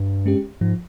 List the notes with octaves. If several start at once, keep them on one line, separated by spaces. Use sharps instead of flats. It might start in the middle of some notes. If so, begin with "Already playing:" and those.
Already playing: G2
G#3 C#4 G4
G#2 F3